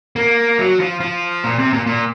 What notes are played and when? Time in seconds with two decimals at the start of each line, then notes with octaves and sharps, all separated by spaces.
0.16 A#3
0.59 F#3
0.80 F3
1.01 F3
1.44 A#2
1.59 C3
1.73 A#2
1.87 A#2